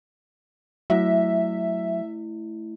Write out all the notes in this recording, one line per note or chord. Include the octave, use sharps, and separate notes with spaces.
F#3 A3 E4 E5